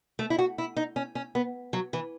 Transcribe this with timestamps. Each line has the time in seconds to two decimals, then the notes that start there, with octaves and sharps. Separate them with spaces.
0.19 A3
0.30 E4
0.39 F#4
0.58 E4
0.77 D#4
0.96 C#4
1.15 C#4
1.35 B3
1.73 F#3
1.93 E3